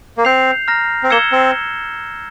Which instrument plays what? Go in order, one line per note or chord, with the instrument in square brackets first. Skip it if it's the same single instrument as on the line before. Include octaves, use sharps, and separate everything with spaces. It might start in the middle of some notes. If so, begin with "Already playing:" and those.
[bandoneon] A#3
[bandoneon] C4 [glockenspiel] G6 C7 F7
[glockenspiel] A#5 F6 A#6
[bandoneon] C4
[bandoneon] A#3 [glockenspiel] E6 G#6 C#7 E7 G7
[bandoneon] C4